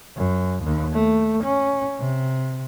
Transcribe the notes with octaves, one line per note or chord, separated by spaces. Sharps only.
F#2
D#2
A3
C#4
C3